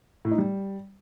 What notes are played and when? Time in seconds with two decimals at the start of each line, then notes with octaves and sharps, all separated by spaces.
0.25 A2
0.31 D#4
0.38 G3